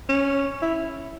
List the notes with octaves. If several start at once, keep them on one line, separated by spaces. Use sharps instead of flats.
C#4
E4